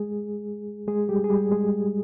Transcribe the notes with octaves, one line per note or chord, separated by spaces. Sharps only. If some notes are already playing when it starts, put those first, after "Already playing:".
Already playing: G#3 G#4
G#3 G#4
G3 G4
G#4
G3 G4
G#3 G#4